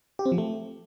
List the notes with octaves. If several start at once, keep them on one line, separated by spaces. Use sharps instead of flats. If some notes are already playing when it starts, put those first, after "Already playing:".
G4
C4
F3
A3